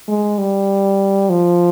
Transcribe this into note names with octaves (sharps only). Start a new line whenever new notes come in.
G#3
G3
F3